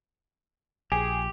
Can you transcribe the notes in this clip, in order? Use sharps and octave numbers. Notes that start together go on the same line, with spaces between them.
A#1 G4 G#4